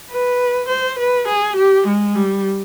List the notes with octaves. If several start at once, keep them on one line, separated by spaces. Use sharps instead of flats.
B4
C5
B4
G#4
G4
G#3
G3